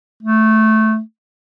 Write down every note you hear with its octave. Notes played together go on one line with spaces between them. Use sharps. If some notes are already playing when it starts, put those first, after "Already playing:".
A3